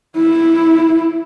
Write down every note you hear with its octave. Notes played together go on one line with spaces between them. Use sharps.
E4